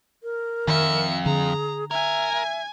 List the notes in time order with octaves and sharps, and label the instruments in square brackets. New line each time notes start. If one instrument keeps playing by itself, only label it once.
[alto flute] A#4
[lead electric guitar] F2 [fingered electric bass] D#3 [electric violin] E5 C#7
[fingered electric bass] D3 [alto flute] G#4 [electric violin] A#5
[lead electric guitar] A#4 [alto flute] E5 [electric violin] G#5 G#6
[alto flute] E5